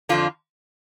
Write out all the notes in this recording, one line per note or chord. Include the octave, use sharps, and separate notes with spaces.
F2 D3 D4 F4